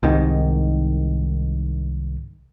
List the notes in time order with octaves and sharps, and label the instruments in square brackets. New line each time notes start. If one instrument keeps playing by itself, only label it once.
[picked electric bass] C2 G#2 D#3